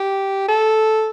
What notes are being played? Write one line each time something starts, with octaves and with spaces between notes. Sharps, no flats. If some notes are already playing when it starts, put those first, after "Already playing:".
Already playing: G4
A4